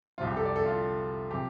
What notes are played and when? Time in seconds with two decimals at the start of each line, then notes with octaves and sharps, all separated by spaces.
0.18 C2 C3 F3 F4
0.27 G4
0.37 A4
0.45 D5
0.56 A4
0.65 F4
1.31 C3 F3 G4